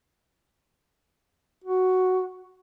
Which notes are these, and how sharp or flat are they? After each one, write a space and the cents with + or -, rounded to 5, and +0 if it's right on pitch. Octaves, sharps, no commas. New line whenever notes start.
F#4 +5